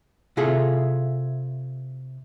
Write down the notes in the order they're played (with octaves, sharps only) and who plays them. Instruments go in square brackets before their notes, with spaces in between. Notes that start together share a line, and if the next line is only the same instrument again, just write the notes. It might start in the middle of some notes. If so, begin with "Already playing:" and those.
[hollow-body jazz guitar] C3 E4 F4 G#4 A4